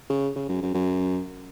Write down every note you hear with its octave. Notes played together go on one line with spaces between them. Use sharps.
C#3
C#3
F#2
F#2
F#2